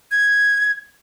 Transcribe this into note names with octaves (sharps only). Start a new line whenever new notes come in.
G#6